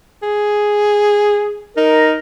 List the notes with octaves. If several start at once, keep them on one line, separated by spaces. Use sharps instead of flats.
G#4
D#4 A#4